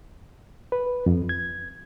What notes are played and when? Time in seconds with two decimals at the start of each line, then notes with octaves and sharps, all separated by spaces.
0.72 B4
1.06 F2
1.29 G#6